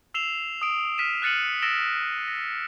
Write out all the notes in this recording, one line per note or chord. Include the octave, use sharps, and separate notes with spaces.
E6 C7 E7 F7 G7
D#6 D7
F6 B6 D#7 E7
F6 F#6 A6 C#7 D#7 F#7
E6 A6 A#6 D7 E7 G7
A#6